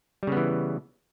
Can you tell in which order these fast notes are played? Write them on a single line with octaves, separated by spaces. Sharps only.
G3 C#3 B3 E3